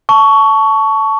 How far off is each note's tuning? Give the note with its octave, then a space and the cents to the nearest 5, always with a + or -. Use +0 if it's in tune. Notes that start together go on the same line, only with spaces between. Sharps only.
A5 +0 C#6 +15